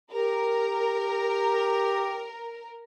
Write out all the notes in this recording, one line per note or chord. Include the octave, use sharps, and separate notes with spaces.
G4 A#4